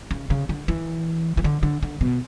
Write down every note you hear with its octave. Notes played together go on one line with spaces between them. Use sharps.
C#3
C#3
D3
E3
E3
D3
D3
D3
B2